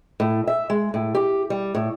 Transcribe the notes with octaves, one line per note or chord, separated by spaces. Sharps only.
A2
E5
G#3
A2
G4
G3
A2